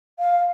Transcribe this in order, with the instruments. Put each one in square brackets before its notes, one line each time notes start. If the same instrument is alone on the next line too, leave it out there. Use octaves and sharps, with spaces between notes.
[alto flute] F5